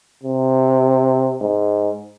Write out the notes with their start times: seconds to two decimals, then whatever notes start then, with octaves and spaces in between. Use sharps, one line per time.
0.24 C3
1.42 G#2